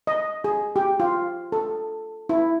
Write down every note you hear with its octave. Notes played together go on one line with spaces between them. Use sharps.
D#5
G#4
G4
F4
A4
E4